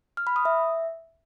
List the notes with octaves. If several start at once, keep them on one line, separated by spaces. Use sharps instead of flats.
F6
B5
D#6
E5